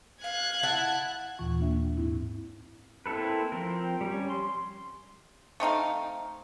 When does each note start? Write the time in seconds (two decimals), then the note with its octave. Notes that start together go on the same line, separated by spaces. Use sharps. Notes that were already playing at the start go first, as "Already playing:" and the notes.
0.24 F5 F#6 G#6
0.63 E4 F#5 A5
1.39 D#2 A#2 E3 F4 C#6
1.60 A#3 D4 E5 G5
1.96 G#2 C4 D#4 E4
3.06 A#3 C4 E4 A4 B4
3.52 F3 C4 A#4
4.01 G3 C#4
4.30 C6
5.60 A3 C4 D#4 F5